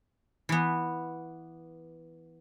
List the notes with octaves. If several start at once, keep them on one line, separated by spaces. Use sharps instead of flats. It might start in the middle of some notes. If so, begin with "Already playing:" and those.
E3 B3